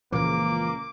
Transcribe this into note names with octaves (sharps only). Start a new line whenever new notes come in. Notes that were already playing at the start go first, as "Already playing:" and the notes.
C#2 A#2 E3 F3 A#3 D6